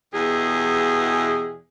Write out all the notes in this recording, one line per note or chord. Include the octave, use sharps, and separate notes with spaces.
E2 B2 G4 G#4